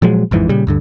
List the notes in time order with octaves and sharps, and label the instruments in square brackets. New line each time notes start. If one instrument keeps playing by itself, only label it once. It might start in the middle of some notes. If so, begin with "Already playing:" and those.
[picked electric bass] A#2 F3 F#3 G#3
A1 F2 G#2 E3
A#2 C#3 G3
D2 G2 D3